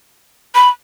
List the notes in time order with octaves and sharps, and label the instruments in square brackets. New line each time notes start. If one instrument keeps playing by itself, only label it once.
[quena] B5